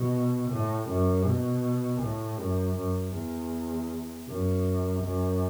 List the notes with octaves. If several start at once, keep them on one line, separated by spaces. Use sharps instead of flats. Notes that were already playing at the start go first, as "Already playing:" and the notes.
Already playing: B2
A2
F#2
B2
A2
F#2
F#2
E2
F#2
F#2